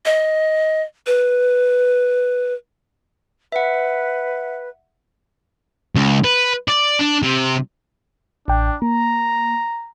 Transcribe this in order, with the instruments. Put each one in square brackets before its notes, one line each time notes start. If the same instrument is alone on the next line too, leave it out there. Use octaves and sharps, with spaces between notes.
[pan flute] D#5
B4
[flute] B4 [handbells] E5 F#5
[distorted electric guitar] C#2
B4
D5
D4
C3
[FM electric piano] A1 G5 [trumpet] D4
[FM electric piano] A#3 [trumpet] A#5